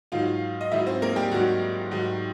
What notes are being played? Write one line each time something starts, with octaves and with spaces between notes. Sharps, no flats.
G#2 D#3 F#3 F4 F5
D#5
G#2 D#3 F#3 E4 E5
C4 C5
A#3 A#4
G3 G4
G#2 D#3 F#3 F#4
G#2 D#3 F#3